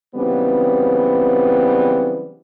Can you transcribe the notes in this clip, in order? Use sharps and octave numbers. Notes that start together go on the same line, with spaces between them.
C#3 E3 F#3 G3 B3 C4